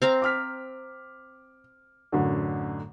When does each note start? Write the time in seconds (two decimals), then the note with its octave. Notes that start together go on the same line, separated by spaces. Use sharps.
0.02 C4 F5 A#5
0.22 D6 F6 B6
2.12 A1 F#2 D3